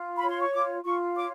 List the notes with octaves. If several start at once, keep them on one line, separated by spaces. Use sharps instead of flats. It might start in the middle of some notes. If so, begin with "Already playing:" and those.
Already playing: F4
C#5 B5
C6
C#6
F4 D6
F4 C#6
C#5 D6